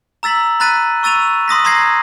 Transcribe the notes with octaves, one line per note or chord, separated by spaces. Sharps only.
A#5 E6 A6 B6 F#7
A#5 B5 F#6 A6 B6 D#7
C#6 E6 A6 D#7 F7
C6 D#6 A#6 B6
A#5 C6 D#6 G#6 A#6 C7